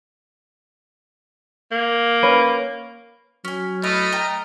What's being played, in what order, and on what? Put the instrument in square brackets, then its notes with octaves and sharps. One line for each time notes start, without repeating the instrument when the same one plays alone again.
[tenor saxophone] A#3
[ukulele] C#4 B4 C#5
[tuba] F#3 [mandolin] C#4 G#5
[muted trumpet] A3 [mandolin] E4 [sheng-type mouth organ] D#5 F6
[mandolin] G5 A#5